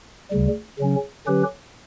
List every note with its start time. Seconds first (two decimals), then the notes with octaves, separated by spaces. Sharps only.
0.31 D2 C#3 G3
0.79 C#3 F#3 C#4
1.27 D3 F#3 C#4 G4 B4